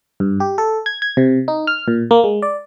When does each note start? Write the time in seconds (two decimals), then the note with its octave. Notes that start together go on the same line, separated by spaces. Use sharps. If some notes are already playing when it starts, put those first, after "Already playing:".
0.20 G2
0.40 G4
0.58 A4
0.86 G#6
1.02 G#6
1.17 C3
1.48 D#4
1.67 F6
1.88 A#2
2.11 A#3
2.24 G#3
2.42 D5